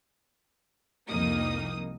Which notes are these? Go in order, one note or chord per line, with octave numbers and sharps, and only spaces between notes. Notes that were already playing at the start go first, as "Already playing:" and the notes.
C2 F2 A#3 D#4 D#6